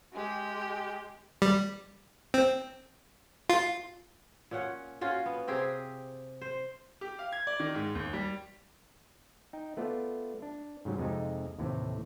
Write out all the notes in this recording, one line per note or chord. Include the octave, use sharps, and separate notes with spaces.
G#3 G4
G3
C4
F4
A#2 C#4 F#5
C#4 F4 F#4
B3
C3 C4 G4 G#4
C5
G4
F5
G#6
D5
D#3
G#2
D#2
G3
D#4 G5
A3 B3 F4 D5
D4
G#2 C#3 F#3 G3
F2 C3 G#3 D#4
D#2 A2 C3 E3